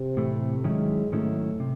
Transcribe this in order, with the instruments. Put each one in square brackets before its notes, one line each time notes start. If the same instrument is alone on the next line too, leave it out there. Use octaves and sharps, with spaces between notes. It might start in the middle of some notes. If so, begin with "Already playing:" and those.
Already playing: [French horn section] C3
[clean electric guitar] A2 E3 A3
[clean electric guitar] G#2 D#3 F#3 C#4 E4 [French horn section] G#3
[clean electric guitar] G#2 D#3 F#3 C#4 E4 [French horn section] A3
[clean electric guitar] C3